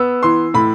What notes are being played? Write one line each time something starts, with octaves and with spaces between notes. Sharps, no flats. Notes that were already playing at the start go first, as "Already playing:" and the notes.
Already playing: B3 E6
E3 C6
A2 B5